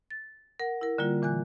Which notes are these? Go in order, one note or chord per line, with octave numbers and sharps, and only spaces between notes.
A6
A#4 F#5
E4 A#4
D3 G3 A#3 F4
A#2 E3 G#5 F#6